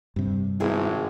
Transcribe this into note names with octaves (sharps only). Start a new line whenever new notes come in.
G2 C3
G#1 B3 E4 G#4